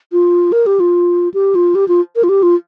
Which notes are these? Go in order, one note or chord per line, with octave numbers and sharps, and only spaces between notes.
F4
A#4
G4
F4
G4
F4
G4
F4
A#4
F4
G4
F4